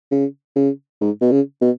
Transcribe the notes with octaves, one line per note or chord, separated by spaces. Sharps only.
C#3
C#3
G#2
B2
C#3
B2